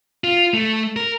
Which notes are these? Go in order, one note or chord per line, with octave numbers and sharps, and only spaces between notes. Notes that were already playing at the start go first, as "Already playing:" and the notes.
F4
A3
A#4